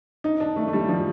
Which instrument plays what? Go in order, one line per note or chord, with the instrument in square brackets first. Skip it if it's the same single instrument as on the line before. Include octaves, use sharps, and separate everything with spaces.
[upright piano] D#4
D4
A3
A3
G3
F3